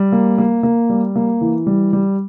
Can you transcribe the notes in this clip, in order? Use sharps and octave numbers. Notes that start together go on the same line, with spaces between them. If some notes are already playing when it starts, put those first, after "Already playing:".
Already playing: G3
A#3
A#3
A#3
G3
A#3
E3
G3
G3